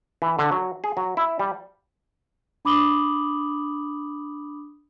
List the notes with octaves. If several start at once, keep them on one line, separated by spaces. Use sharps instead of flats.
E3
D3
F#3
G#4
F#3
E4
G3
D4 B5 D6 D#6 F#7 G7